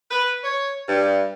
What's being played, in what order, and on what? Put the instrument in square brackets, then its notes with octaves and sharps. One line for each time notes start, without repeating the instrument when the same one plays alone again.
[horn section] B4
C#5
G2